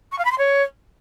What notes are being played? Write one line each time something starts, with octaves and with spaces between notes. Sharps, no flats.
C#6
F5
B5
C6
C#5